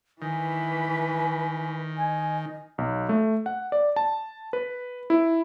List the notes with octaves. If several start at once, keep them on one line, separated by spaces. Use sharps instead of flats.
D#3 E3 B4 G#5
D#5 G#5
B1
A3
F#5
D5
A5
B4
E4